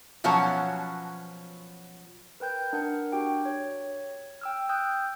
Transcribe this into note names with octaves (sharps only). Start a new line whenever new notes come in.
B2 F3 F#3 C#4 F#4 C#5
A#4 B4 G5 G6
D4 A#4 F#5
D4 F#4 G4 G5
C#5
G5 E6 F6
G5 D#6 E6 F#6 G6